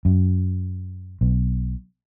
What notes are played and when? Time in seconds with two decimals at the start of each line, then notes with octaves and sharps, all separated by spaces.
0.05 F#2
1.21 B1